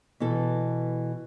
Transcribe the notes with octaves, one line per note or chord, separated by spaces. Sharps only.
B2 E3 A4